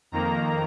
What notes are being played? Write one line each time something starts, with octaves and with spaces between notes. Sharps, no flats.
F2 D#3 A#3 A#5